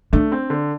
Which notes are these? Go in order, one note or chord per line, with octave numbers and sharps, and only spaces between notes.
A3 D4
C4
D3